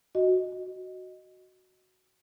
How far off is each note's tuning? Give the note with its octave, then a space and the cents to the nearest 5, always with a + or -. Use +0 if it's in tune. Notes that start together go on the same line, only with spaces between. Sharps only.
F#4 +0 D#5 +0